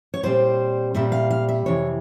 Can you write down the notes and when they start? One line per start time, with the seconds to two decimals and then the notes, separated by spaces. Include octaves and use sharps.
0.14 C#5
0.23 A#2 G3 C4 C5
0.94 A#2 G3 C4 E5
1.12 F5
1.30 F5
1.48 E5
1.66 F2 C3 E3 C#5